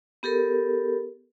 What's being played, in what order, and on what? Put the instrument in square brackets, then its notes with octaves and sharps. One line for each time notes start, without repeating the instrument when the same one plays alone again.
[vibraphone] B3 G4 A4 A#4